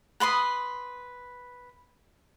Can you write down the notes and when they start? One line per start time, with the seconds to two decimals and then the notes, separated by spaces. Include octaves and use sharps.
0.20 B4 B5 C6 D#6